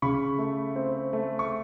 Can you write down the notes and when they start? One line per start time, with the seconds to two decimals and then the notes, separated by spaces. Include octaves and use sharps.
0.02 C#3 B5 C#6
0.38 A3
0.76 C4
1.13 A3
1.39 C#6